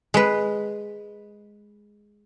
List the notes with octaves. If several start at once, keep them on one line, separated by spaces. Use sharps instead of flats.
G#3 B4